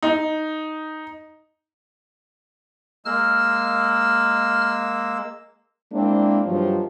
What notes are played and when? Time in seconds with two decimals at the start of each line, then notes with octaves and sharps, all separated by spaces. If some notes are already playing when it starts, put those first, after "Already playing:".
0.02 D#4
3.05 G#3 A#3 E6 F6
5.92 G#3 A#3 C4 D4 E4
6.46 G2 C3 D#3 F3 F#3